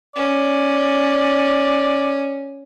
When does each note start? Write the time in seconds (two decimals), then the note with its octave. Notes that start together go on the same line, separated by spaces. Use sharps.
0.16 C#4 D5